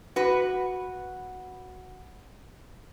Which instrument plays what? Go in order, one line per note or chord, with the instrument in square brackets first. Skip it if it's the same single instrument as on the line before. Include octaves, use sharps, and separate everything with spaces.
[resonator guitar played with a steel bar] F#4 B4